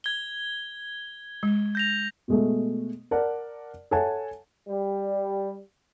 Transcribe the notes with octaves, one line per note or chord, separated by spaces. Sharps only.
G#6 G7
G#3
G6 A#6 F7
B2 G#3 A3
A#4 D5 F#5 A5
A4 C#5 E5 F#5 G#5 A5
G3